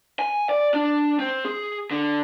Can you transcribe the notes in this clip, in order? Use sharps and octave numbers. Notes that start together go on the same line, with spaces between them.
G#5
D5
D4
C4
G#4
D3